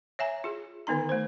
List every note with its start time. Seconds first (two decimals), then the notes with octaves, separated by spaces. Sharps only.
0.19 C#5 E5 G#5 A#5
0.44 F4 G#4
0.87 D3 D#3 B3 D#4 A#5
1.09 A3 C5